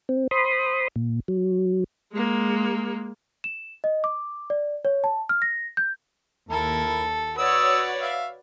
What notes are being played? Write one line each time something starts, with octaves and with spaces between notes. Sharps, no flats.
C4
C5 B5 C6 D#6
A#2
F#3
G#3 A#3
E7
D#5
D6
D5
C#5
A5
F6
A#6
G6
D#2 E4 A4 A#4
F#4 B4 C#5 D5 D#6 E6
E5 F5